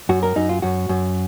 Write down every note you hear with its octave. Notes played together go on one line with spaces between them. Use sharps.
F#2 F#4
A#4
F#2 D#4
F4
F#2 F#4
F#2